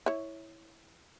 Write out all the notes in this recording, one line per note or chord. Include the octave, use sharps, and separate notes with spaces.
E4 C#5